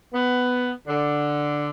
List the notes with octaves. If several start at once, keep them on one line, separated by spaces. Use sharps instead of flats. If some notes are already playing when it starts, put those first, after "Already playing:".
B3
D3